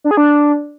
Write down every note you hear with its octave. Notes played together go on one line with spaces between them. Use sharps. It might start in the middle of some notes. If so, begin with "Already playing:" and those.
D4
G#4
D4